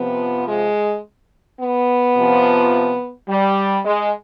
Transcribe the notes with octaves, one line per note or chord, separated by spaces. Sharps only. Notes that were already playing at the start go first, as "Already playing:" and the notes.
Already playing: C3 F3 B3
G#3
B3
C3 F3
G3
G#3